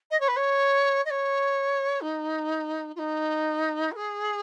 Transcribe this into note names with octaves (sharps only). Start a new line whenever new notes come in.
D#5
C#5
B4
C#5
D#5
C#5
D#4
F4
D#4
B4
G#4